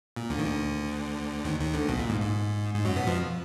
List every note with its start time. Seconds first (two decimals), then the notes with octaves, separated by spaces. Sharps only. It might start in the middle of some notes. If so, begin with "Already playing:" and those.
0.16 A#2
0.30 D2 D3
0.39 D#3
0.45 D2 D3
1.44 D#2 D#3
1.59 D#2 D#3
1.74 D2 D3
1.88 B1 B2
1.99 A#2
2.09 G#2
2.20 G#2
2.74 G#2
2.85 F#2 F#3
2.96 B2 B3
3.07 F2 F3